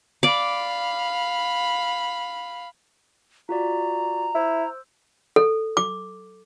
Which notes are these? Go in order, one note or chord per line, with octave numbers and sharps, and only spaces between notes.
D5 F5 B5 D6
F4 F#4 D5 A#5
E4 C5 E6
A4
D6